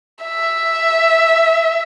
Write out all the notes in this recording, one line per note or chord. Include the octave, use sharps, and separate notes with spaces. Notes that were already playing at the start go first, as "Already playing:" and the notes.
E5